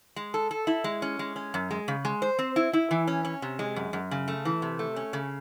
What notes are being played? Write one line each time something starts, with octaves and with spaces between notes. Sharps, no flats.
G#3
A4
A4
E4
G#3
C#4
G#3
C#4
F#2
G#3
C#3
G#3
C5
C4
E4
E4
E3
C#4
C#4
C3
G#3
F#2
F#2
C#3
A3
E3
C3
A3
C#4
C#3